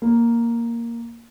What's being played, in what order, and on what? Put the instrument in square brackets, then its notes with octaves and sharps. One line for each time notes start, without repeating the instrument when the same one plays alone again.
[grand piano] A#3